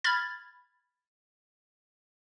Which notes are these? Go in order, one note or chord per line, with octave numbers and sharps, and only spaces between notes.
B5 F6 G#6 A6